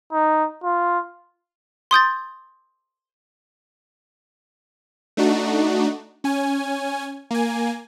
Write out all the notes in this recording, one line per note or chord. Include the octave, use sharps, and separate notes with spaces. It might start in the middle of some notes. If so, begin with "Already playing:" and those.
D#4
F4
C6 D#6 G6 A6
A3 D4 D#4 F#4
C#4 G#5
A#3 G#5